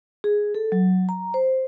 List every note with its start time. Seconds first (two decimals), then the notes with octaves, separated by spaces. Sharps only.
0.24 G#4
0.55 A4
0.72 F#3
1.09 A#5
1.34 C5